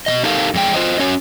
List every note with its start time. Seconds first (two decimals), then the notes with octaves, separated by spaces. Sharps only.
0.06 B2 E3 D#5
0.23 D#4 G4 A4 A#4 F5
0.54 F2 G#3 G5
0.74 F4 C5 D#5
0.99 C#4 F#4 C#5